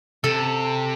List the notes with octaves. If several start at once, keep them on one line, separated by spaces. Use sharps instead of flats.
C3 A4